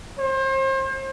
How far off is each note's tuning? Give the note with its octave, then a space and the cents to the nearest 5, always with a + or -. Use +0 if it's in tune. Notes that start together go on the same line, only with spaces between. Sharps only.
C5 +35